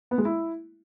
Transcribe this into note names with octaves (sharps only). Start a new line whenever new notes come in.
B3
G#3
E4